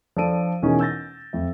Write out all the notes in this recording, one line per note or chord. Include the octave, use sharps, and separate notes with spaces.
F3 D4 A4 D5 D7 D#7
B2 E3 C#4 D#4 G#4 A#4
E6 G6 A6 A#6
F2 E5